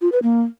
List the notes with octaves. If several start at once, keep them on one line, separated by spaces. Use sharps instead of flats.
F4
B4
A#3